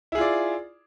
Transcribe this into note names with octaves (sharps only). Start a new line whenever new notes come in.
E4 F4 G#4 D5